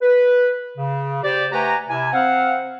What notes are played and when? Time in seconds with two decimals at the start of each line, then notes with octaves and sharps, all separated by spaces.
0.02 B4
0.77 C#3
1.23 G4 C5 D5
1.52 A3 G4 B4 F#5 G#5 A#5
1.89 C3 E4 G#5
2.13 C4 C5 F5 F#5